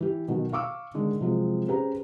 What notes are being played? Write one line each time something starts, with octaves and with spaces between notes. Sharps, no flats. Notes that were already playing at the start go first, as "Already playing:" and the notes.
E3 G4
B2 D#3 F#3
F5 C#6 D6 E6
D3 D#3 G#3 D4
C3 F3 F#3 G#3 C4
C#4 G4 G#4 B4 C5 A#5